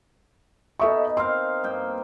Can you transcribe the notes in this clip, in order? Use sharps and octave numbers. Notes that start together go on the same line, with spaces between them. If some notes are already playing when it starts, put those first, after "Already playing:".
B2 D#4 A4 E5 C#6
C4 A#4 F5 C6
G2 A#3 G5